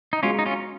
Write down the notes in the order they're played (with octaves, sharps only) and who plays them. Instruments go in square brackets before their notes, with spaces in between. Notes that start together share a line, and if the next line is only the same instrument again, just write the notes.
[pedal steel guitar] D#4
[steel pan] G#3 B3 F#4 [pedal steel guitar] C#4 F4
[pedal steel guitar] D#4
C#4 F4